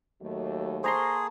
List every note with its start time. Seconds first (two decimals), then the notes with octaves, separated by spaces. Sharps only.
0.22 D#2 F#3 A3
0.84 A#3 G#4 C5 A5 A#5 C6 C#6